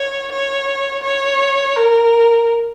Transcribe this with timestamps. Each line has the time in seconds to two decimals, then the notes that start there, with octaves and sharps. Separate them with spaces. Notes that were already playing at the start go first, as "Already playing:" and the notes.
Already playing: C#5
0.32 C#5
1.03 C#5
1.75 A#4